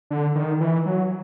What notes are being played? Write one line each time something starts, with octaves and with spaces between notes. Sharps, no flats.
D3
D#3
E3
F#3